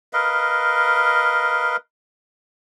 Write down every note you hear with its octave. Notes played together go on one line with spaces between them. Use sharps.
A#4 B4 D#5 F5